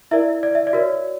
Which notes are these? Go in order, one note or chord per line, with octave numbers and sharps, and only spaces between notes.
E4 A#4 D5 E5
D5
E5
D5
F#4 A#4 C#5